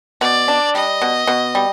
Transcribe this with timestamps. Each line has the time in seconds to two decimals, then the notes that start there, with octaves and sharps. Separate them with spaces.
0.21 B2 D5
0.48 D4
0.75 G3 D#5
1.02 B2
1.27 B2
1.55 G3